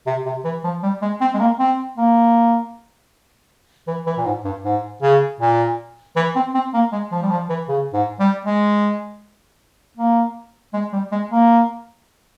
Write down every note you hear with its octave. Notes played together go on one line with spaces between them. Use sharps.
C3
C3
E3
F3
G3
G#3
C4
G#3
A#3
C4
A#3
E3
E3
A#2
G#2
G2
G#2
C#3
A#2
E3
C4
C4
A#3
G#3
F3
G3
F3
E3
C#3
G#2
G3
G#3
A#3
G#3
G3
G#3
A#3